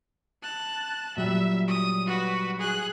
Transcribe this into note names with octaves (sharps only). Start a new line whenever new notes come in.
A5 F#6
A#2 F#3 G3 E5
D#6
F#4 B4
G#4 F#6